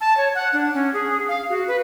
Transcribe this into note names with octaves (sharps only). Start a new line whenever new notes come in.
A5
C#5
F#5
D4
C#4
G#4
F5
F#4
B4